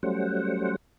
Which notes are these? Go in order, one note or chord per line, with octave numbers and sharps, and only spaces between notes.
F#3 G3 A3 C#4 C5 F#5